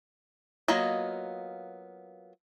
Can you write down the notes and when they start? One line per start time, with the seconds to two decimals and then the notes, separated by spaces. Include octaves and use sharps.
0.68 F#3 A#3 B3 F4 D#5